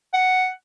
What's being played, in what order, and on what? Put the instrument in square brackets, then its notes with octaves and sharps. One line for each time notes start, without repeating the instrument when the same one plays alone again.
[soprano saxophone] F#5